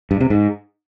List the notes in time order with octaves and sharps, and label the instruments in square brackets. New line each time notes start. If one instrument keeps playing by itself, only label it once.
[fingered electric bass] G2
C3
G#2